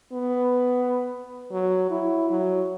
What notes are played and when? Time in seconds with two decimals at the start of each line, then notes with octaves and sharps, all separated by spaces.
0.12 B3
1.52 F#3
1.91 E4
2.30 F#3